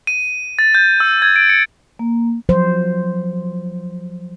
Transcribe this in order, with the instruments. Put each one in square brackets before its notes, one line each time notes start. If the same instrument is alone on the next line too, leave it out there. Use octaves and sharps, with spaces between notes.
[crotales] D#7
A6
G6
E6
G#6
D7
C#7
[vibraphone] A#3
[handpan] F3 F#3 C5